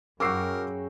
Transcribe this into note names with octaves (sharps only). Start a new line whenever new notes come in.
F#2 C#3 F#4 A#4 G5 D6 E6 C7